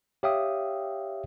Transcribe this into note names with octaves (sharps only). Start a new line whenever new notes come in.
G4 C#5 E5 F5 G5 D#6